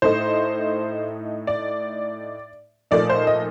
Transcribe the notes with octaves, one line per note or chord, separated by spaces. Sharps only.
A2 A3 D#4 C5
D5
A#2 F3 A3 D#4 D5
C5
D#5